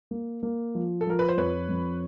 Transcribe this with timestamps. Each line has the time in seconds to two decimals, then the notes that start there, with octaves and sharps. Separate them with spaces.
0.11 A#3
0.43 A#3
0.75 F3
1.01 A4
1.07 F3 A#4
1.19 B4
1.29 C5
1.37 F2 B4 C#5
1.69 F2